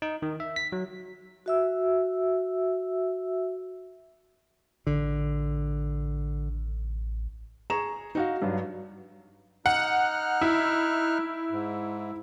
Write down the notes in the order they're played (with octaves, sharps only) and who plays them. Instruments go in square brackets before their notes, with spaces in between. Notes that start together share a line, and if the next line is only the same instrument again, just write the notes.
[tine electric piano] D#4
D#3
E5
B6
F#3
[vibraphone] F#4 E5 E6
[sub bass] A1 [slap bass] D3
[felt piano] G#4 A#5 C#6 E7
D#4 F#4 F5
G2 F#3
[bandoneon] D#4 F6 F#6 [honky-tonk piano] F#5
[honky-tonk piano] E4
[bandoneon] G#2